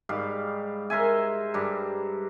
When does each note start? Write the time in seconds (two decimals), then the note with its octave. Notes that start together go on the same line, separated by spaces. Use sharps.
0.09 G#2 G3 F5
0.90 A#4 C5 E5 G#5
1.54 G2 G3